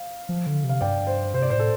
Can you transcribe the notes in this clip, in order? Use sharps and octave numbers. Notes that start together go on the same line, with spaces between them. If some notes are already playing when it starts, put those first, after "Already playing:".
Already playing: F5
F3
D3
C3
F5
G2 D5 G5
C5
C3 C5
D5
A2 C5
A4